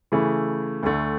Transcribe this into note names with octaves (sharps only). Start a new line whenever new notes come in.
C#3 E3 A3 E4
D2 D3 A3